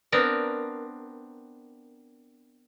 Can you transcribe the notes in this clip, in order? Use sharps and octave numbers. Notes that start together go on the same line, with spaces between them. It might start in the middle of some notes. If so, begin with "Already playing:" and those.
B3 C4 D4 A#4